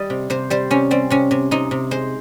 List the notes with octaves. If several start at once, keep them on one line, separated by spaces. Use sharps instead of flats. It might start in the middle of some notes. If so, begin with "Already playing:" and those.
Already playing: G3 D#5
C3
C3 C5
G3 C5
C3 C#4
G3 C4
C3 C#4
C3
C3 D#4
C3
G#3 C5